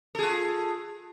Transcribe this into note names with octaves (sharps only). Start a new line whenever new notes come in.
F4 G#4 A4